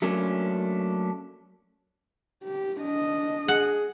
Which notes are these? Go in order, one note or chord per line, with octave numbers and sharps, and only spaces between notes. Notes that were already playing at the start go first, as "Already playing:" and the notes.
F#3 A3 A#3 C#4 D4
G4
D4 D#5
G#4 F#5